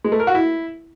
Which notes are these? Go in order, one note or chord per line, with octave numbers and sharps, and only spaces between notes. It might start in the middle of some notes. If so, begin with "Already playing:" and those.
G#3
A3
A#4
F#4
E4